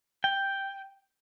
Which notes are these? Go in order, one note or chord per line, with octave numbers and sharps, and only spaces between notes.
G5